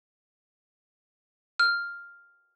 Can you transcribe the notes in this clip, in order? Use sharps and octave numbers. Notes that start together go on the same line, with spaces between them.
F6